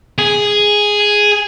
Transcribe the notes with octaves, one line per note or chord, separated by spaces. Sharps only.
G#4